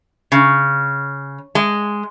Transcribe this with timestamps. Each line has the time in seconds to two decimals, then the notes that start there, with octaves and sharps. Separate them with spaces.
0.32 C#3
1.55 G#3